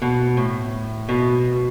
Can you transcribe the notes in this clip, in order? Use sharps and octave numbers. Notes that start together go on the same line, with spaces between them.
B2
A2
B2